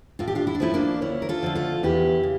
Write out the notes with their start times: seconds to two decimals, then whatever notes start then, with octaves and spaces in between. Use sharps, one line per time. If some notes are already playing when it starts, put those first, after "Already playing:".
0.19 A2 F4
0.28 G4
0.35 D4 F4
0.47 E4
0.55 D4
0.60 F3 A3 C#4 E4
0.74 A#3 D4
1.01 D2 C#4 E4
1.22 A#4
1.29 F4 A4
1.43 D3 F3 A3
1.55 F4 A4
1.83 E2 E4 G4
2.23 C#3